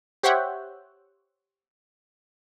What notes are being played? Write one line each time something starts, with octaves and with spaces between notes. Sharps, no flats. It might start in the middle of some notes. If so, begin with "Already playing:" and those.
G4 C5 C#5 E5 F#5 G5